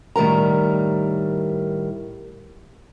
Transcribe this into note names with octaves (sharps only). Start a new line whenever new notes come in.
A2 D#3 G3 A#4 A#5